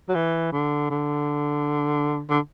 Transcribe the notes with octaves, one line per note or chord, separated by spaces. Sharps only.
F#3
E3
D3
D3
D3